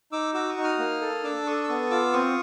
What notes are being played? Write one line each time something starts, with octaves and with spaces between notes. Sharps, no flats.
D#4 D6 E6
F#4 D6 E6
C#6 D#6
D#4
D#6 F6
A#3
A4
D4 D6 E6
A4 C#6 D#6
E6
B3 C#6 D#6
F4 D6 E6
C4 C#6 D#6